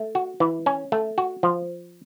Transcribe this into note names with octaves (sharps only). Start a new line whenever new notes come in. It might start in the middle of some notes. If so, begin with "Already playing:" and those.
Already playing: A3
F#4
E3
C#4
A3
F#4
F3